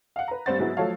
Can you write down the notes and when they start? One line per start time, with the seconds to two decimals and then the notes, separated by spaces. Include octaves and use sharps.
0.16 F5 F#5
0.28 B4 A#5
0.46 G2 G3 C4 C5 F#5 A6
0.58 G#2 F#3 G#3 B3 E4 F#4
0.77 F3 F#3 A3 A4 C#5 F5